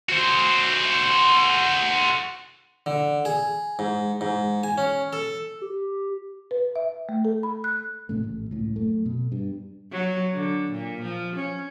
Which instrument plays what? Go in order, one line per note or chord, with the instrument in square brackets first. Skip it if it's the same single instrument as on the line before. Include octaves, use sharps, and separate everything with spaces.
[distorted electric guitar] F#4 C5
[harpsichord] D3
G#4
G#2
G#2
G#5
C#4
A4
[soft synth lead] G4
[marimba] B4
E5
A3
A4
B5
F#6
[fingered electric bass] A#1 A2 C#3 A3
A1
C#2 A2
F#2 A3
B2
G2
[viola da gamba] F#3
D3
A#2
F3
C#4